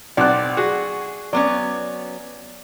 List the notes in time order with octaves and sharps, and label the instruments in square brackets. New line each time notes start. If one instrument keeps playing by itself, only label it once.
[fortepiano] B1 F#6 [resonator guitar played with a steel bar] C4 [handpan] D5
[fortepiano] F#4 [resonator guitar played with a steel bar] G#4
[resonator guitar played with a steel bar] F#3 B3 C#4 [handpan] D5